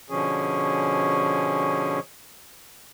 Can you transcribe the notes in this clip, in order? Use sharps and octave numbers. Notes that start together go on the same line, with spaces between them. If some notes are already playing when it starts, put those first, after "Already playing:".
B2 D3 F3 C#4 G#4